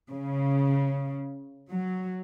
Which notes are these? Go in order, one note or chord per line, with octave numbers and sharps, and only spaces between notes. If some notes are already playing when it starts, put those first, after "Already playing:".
C#3
F#3